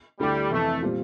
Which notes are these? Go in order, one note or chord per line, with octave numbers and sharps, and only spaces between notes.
D2 D3 G3 A3 E4 G4
F2 C3 E3 A3
A#2 G3 C4 F4